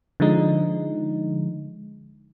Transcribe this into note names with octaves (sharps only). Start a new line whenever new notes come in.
D3 F3 G#3 D#4